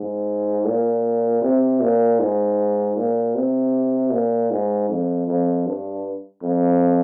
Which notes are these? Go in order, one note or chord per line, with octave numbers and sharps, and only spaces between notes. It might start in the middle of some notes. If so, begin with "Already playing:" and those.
Already playing: G#2
A#2
C3
A#2
G#2
A#2
C3
A#2
G#2
F2
F2
G2
F2